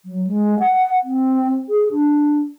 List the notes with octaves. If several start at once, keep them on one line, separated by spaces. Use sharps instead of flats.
F#3
G#3
F#5
C4
G#4
D4